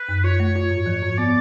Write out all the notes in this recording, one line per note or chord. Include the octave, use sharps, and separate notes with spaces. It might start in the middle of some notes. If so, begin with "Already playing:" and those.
Already playing: B4
F#2
F4 C#5
A3
F4
G#2
F3
G#2
B3 D5